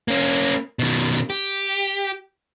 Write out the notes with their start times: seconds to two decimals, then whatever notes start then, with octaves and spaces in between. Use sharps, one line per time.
0.08 A#3 C#4
0.79 B2 D#3
1.30 G4